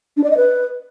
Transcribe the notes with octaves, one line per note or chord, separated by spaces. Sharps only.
D4
D5
D#5
B4